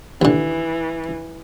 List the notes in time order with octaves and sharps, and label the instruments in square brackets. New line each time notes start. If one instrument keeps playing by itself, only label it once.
[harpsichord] D#2 D3 [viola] E3